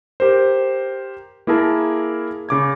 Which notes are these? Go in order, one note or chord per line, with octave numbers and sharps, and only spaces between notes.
G4 A#4 C5
A#3 E4 G#4 A#4 A5
C#3 D6 G#6